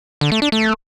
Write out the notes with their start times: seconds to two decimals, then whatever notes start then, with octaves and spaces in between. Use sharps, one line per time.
0.21 D3
0.32 A3
0.42 D4
0.52 A3